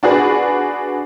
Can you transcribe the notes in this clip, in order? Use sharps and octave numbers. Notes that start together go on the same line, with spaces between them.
D4 F#4 G#4 B4